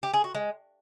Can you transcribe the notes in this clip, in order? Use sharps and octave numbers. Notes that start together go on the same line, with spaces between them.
G4
G#4
F#4
G#3